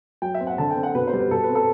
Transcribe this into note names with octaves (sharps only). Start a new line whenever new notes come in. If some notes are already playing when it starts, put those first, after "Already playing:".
F#3 G5
E5
C4
F#5
D3 A5
G5
C4
F#5
B2 B4
C5
G3
B4
B2 A4
B4
C4
A4